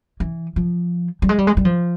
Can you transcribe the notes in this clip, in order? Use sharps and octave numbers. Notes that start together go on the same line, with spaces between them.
E3
F3
G3
G#3
G3
G#3
G3
F3